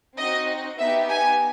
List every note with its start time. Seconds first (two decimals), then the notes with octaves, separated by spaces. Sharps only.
0.17 C4 D#4 F#4 D#5
0.80 B3 D#4 G4 E5
1.10 G#5